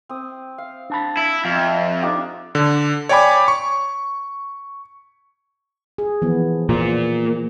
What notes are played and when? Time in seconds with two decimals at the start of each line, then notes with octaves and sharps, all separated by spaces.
0.09 C4 D#6
0.58 F5
0.90 D4 A5 B5
1.17 E4
1.45 F2 F4 E5 F5
2.03 D4 D#4 F4 G4
2.55 D3
3.09 C#5 D5 G5 G#5 B5 D6
3.48 C#6
5.98 G#4
6.22 E3 F3 B3
6.69 A#2